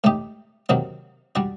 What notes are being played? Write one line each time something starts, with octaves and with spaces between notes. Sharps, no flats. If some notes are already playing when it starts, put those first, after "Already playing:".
A2 A3 D#4 G4
C3 D#3 F#3 A#3 D#4
G3 D4 F#4